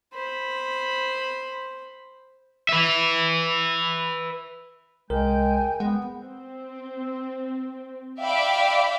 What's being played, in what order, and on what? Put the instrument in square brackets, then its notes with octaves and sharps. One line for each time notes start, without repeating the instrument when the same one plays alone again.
[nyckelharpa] C5 B5
[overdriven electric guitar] B4 E5
[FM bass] C2 [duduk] G#3 [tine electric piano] A#4 [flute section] G5 G#5 G6
[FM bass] G#3 [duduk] B3 [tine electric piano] F#5
[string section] C4
D5 E5 F5 G5 B5 D6